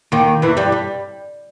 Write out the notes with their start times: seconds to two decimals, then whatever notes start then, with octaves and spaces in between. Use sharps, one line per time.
0.12 D#2 D#3
0.42 E2 E3
0.57 G2 G3
0.72 G3